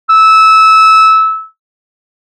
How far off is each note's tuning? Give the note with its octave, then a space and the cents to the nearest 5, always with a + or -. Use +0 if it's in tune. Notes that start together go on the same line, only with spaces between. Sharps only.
E6 -20